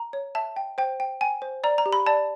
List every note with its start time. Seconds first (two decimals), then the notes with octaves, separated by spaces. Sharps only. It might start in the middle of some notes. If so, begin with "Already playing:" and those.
Already playing: A#5
0.13 C#5
0.35 E5 A5
0.56 G5
0.78 C5 G5
1.00 G5
1.21 G5 G#5
1.42 C5
1.64 D5 A#5
1.78 A#5
1.86 G4
1.93 B5
2.06 D5 A5